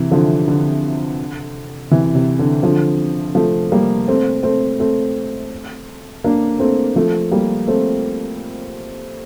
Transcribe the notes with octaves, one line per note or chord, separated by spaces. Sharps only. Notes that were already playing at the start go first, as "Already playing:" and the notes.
Already playing: C3 E3
D3 F3
D3
C3 E3
C3
D3
D3 F3
F3 A3
G3 A#3
A3 C4
A3 C4
A3 C4
A#3 D4
A3 C4
F3 A3
G3 A#3
A3 C4